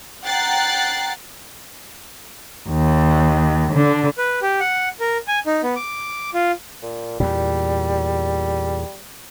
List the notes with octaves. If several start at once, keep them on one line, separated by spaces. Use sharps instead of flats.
F#5 G5 A#5 F#6 A6 C7
D#2
D3
B4
G4
F#5
A#4
G#5
D#4
B3
D6
F4
A#2
E2 A#2 G3